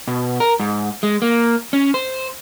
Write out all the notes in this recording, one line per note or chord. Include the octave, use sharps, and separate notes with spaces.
B2
A#4
G#2
G#3
A#3
C#4
C5